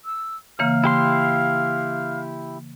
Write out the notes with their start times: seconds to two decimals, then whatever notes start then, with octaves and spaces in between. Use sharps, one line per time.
0.05 E6
0.59 C#3 E3 A#3 F5 F6
0.84 E4 G4 C6